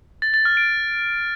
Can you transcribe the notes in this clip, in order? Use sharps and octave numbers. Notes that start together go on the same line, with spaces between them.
A6
A6
F6
D7